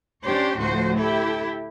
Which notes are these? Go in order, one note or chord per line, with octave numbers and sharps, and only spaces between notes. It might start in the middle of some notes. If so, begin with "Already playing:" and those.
C#4 D4 G4 C5 C#5
D2 A2 F3 F#4 C5
E4 G4 A4